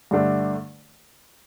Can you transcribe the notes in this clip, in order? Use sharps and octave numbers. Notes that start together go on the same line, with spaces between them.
G2 D3 A3 D4